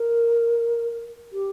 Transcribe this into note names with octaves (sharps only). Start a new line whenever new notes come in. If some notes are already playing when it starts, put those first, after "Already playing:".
Already playing: A#4
G4